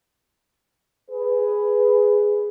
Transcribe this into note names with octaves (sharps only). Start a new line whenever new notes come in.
G#4 B4